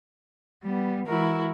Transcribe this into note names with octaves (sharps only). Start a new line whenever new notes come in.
G3 B3
E3 G#3 E4 F#4 A#4